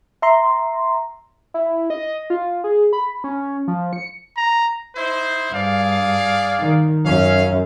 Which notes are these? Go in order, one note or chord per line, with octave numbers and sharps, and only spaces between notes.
E5 A#5 C6
E4
D#5
F4
G#4
B5
C#4
F3
C#7
A#5
D#4 E4 C5
G2 G#4 D5 F5
D#3
F#2 C#4 F5